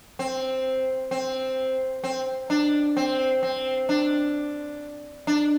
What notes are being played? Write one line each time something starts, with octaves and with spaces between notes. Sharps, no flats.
C4
C4
C4
D4
C4
C4
D4
D4